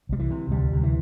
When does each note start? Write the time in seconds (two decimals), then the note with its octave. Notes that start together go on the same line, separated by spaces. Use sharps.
0.09 C2 G3
0.19 E3
0.31 C3
0.51 D2 G3
0.73 C3
0.83 E3